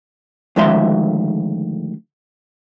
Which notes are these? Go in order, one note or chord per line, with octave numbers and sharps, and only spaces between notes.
D2 D#3 F3 G#3 E5 C6